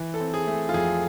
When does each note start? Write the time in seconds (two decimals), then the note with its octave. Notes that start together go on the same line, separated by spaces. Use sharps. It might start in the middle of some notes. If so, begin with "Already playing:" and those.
Already playing: E3
0.14 A4
0.20 C4
0.34 G#4
0.47 A3
0.69 F4
0.74 F2 G#4